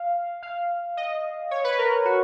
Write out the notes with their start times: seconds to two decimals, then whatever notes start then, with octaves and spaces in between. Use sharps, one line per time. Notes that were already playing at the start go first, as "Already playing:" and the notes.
Already playing: F5
0.43 F5
0.97 D#5
1.51 C#5
1.64 B4
1.78 A#4
2.05 F#4